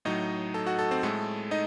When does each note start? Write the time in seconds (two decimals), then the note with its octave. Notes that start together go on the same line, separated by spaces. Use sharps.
0.05 A2 F#3 D#4 D#5
0.54 A4 A5
0.66 F#4 F#5
0.79 A4 A5
0.91 C4 C5
1.03 A2 G#3 A3 A4
1.51 D#4 D#5